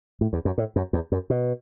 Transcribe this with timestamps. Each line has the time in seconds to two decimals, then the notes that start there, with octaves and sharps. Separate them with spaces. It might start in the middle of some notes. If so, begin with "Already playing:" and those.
0.21 A2
0.33 E2
0.45 F#2
0.58 A2
0.76 F#2
0.93 E2
1.12 F#2
1.30 B2